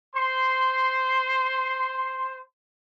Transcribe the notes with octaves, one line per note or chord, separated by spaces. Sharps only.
C5 C6